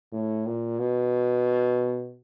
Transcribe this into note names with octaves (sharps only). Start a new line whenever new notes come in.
A2
A#2
B2